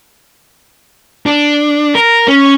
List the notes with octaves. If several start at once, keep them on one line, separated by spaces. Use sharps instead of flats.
D4
A#4
C#4